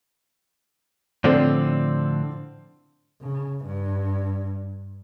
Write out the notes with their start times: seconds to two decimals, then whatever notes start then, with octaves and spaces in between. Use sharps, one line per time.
1.24 A2 D3 F3 C4 A4 D5
3.22 C#3
3.66 G2